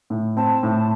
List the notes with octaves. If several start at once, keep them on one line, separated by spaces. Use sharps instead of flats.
A2
C4 A5
A2